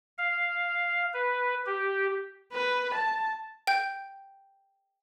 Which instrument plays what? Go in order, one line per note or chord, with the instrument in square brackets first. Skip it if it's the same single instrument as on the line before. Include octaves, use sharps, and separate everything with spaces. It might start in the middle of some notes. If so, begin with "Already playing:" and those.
[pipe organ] F5
B4
G4
[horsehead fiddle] B4
A5
[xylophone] G5 G6